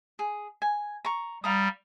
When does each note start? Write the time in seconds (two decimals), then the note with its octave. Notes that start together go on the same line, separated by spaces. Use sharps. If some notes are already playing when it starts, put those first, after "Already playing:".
0.19 G#4
0.62 G#5
1.05 A#5 C#6
1.44 G3 F5 A#5 D#6